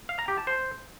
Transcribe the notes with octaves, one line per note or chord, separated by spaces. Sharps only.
F5
A#5
G4
A5
C5